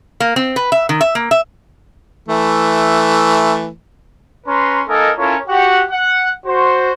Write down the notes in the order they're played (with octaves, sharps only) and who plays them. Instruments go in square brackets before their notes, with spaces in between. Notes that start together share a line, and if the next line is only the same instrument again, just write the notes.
[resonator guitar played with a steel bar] A#3
C4
B4
E5
D#3
E5
A#3
E5
[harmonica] E3 A3
[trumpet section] C#4 B4 A#5 C6
A#3 D#4 A4 A#4 D#5 G#5
C#4 E4 F4 A4 A#4 C#5
F#4 G4 F#5
F#5
F#4 C5